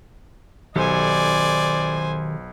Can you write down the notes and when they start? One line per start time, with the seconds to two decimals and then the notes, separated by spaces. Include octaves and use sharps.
0.76 B1 D#3 G4 A4 C5 D5 G#5